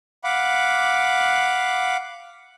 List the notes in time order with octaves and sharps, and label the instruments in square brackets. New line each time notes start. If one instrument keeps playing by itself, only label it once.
[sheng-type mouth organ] F5 F#5 B5 D6